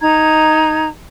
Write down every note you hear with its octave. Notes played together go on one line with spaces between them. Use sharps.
D#4 A#5 G#6